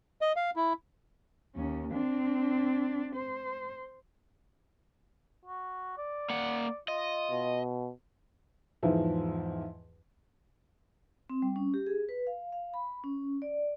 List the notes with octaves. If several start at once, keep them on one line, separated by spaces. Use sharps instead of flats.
D#5
F5
E4
D#2 C#4
C4 D4
C5
F#4
D5
A#3 F#5
F4 D#5
B2
E2 G#2 E3 F3 E4
C4
G3
C#4
G4
G#4
B4
F5
F5
B5
C#4
D5